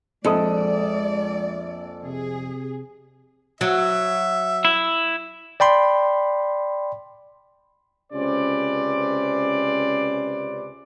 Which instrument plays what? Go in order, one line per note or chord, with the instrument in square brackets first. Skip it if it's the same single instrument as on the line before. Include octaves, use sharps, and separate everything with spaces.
[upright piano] A#1 A4 D#6 [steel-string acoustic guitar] F2 [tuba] G#3 [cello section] D5
[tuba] C3 [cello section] G#4
[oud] F#3 [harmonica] E5
[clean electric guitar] E4
[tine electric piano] D5 G5 B5 C6
[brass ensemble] C#2 C3 C#4 B4 C5 D5